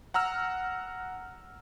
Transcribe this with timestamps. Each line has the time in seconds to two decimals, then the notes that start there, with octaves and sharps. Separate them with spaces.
0.14 F#5 A#5 E6 F6